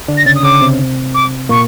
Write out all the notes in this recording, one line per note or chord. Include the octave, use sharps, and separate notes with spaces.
D3 D4
A#6
C#3 C#4 A6
D#6
C#3 C#4 D6
C3 C4
D6
A#2 A#3 C#6